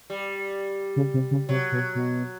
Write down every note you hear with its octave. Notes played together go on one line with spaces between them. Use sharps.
G3
C#3
C3
C#3
C3 F#3
B2
B2